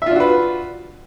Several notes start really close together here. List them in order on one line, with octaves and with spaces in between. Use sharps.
E5 F4 D4 F#4 B4